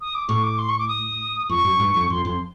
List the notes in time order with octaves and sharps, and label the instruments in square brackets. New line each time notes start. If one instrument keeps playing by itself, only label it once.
[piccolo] D#6
D6
[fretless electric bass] A2 [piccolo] C#6
[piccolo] D6
C6
C#6
D6
D#6
[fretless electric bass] F2 [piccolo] C#6
[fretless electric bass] F#2
G2
F2
[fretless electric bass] F2 [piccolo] C6
[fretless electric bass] F2 [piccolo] C6